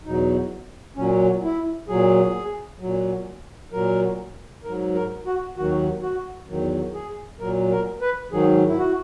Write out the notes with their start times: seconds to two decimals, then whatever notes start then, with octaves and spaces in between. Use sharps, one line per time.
0.05 E2 B2 F#3 D#4
0.96 A#2 F#3 C#4
1.43 E4
1.88 A#2 F#3 G#4
2.80 A#2 F#3
3.72 A#2 F#3 A#4
4.64 G#2 F#3 A#4
4.94 A#4
5.26 F#4
5.56 D#2 D#3 F#3 F#4
6.02 F#4
6.48 E2 D#3 F#3
6.94 G#4
7.40 A#2 F#3 A#4
7.71 A#4
8.01 B4
8.31 G#2 D#3 F#3 G#4
8.67 E4
8.78 F#4